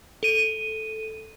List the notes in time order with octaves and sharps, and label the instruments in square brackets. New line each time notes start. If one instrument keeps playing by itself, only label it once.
[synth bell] A4 D#7